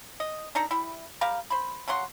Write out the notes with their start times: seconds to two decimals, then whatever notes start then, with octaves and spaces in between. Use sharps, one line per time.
0.20 D#5
0.55 D4 D#4 A4 A#5
0.71 G3 E4
1.21 G3 G4 A#4 F5
1.50 C5 B5
1.88 C#3 F#3 F#5 C6